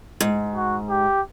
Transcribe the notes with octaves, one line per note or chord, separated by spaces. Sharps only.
G#2
F#4
G4